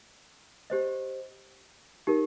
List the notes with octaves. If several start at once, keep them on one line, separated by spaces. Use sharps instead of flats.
G4 C5 D#5
D#4 G4 A#4